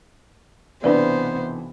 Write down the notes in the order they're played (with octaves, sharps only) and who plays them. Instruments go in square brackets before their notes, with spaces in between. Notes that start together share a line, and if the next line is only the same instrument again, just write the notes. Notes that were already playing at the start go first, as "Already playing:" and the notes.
[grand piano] B1 C3 E3 [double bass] B3 [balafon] D4 B4 D5 [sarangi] C5